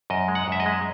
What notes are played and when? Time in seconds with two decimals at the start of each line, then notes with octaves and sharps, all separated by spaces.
0.10 F#2 D#5
0.28 G#3
0.35 F#5
0.48 F#2 E5
0.60 D#5
0.66 G#3